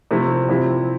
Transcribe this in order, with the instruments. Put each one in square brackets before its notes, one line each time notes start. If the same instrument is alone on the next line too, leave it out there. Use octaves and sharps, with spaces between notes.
[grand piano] C3 F3 A3 E4
C3 F3 C4 E4